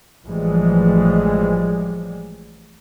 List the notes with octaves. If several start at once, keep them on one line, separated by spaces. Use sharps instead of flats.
A1 E3 F3 G3 G#3